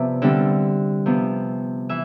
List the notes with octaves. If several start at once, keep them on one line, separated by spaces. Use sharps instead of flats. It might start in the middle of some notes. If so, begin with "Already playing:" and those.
Already playing: C3 F3 B3 B4 D5 E5
D3 G3 C4
C3 F3 B3
E3 E5